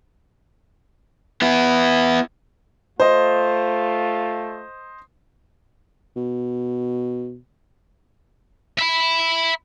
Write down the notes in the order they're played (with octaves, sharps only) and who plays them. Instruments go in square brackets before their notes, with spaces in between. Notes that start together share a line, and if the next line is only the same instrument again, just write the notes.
[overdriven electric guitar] B3 E4
[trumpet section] A3 F4 [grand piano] C5 D#5
[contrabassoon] B2
[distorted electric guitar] E5 B5